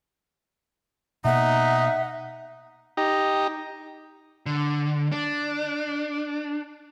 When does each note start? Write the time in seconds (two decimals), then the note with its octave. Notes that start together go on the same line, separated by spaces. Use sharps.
1.25 B2 A#3 D#4 E5 F#5
2.97 D#4 G4 A#5
4.46 D3
5.12 D4